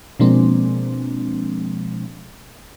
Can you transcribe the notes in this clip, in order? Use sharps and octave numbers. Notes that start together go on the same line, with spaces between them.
B2 F3 G#3 A#3 C4 D4